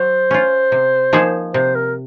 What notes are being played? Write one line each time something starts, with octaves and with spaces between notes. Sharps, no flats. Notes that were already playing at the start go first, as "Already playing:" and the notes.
Already playing: F#3 C5
C#4 F4
C3
F3 A#3 D#4 G#4
C3 C5
A#4